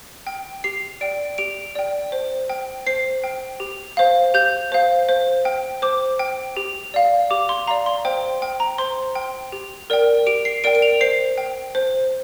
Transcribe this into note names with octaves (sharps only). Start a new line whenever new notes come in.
G5
G4 C7
D5 G5 D7
G4 D7
D5 G5
C5
G5
C5 C7
G5
G4
C5 F5
G4 G6
C5 F5
C5
G5
C5 D6
G5
G4
D5 F5
G4 D6
C6
D5 F5 A#5
C6
C5 G5
G5
A#5
C5 C6
G5
G4
A#4 D5 G5
G4 D7
C7
A#4 D5 G5 D7
D7
F7
C5 C7
G5
C5